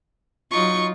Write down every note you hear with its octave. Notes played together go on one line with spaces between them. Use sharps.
F#3 D#4 F4 C#6